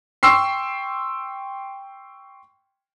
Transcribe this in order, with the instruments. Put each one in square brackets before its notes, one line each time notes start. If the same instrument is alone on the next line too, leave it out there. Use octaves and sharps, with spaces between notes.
[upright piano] G5 C6 C#6 E6 C7